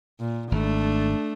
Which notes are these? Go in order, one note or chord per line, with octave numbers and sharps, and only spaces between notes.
A#2
G#1 A3 D4